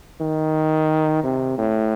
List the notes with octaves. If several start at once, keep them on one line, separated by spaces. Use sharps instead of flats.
D#3
C3
A2